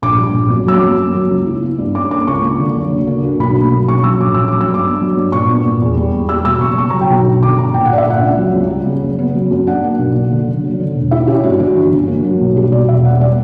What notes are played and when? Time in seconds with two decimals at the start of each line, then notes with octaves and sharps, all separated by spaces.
0.02 A#1 D6
0.18 G3
0.34 A#1
0.50 F#2
0.67 F#3 E6
0.74 D6
0.83 F#2
0.98 A#3
1.15 F#3
1.31 C#2
1.47 E4
1.63 B3
1.79 G2
1.95 C#4 D6
2.11 A#3 D6
2.27 C#2 C#6
2.43 A#3
2.60 D3
2.76 F#1
2.92 D2
3.07 A#3
3.23 D2
3.39 B1 B5
3.56 A#3
3.72 B1
3.88 C#4 C#6
4.04 F#3 E6
4.21 A#1 D6
4.34 C#4 E6
4.48 F#3 D6
4.61 E6
4.69 G2
4.74 D6
4.85 B3
5.01 F#3
5.17 G2
5.32 A#2 C#6
5.49 B3
5.65 A#2
5.82 E2
5.97 G3
6.13 E2
6.29 G3 E6
6.45 B2 E6
6.61 F#1 C#6
6.78 B3 C#6
6.90 A#5
6.94 F#3
7.01 G5
7.10 B1 A#5
7.25 G1
7.43 D3 D6
7.58 G1 A#5
7.74 A#2 G5
7.86 F#5
7.90 D4 D5
7.98 E5
8.07 A#2 F#5
8.23 C#2
8.38 F#3
8.54 C#2
8.70 G3
8.87 C#3
9.03 F#1
9.19 B3
9.35 F#3
9.51 F#2
9.67 D4 F#5
9.84 A#3
9.99 B1
10.16 F#1
10.32 D3
10.48 F#1
10.64 F#3
10.80 D3
10.95 E1
11.11 E4 E5
11.27 C#4 G4
11.44 G2 F#4
11.60 G1 F#4
11.76 E3
11.92 G1
12.08 A#3
12.24 F#3
12.41 B1
12.57 G3 G4
12.72 B2 D5
12.89 E1 E5
13.04 A#3 F#5
13.20 G3 D5